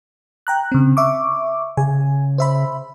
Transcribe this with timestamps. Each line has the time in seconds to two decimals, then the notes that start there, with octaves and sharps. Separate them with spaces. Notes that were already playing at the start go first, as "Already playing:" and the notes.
0.47 G5 A#5 F#6
0.72 C#3 C4
0.97 E5 C#6 D6
1.77 C#3 G#5
2.38 C5 E5 B5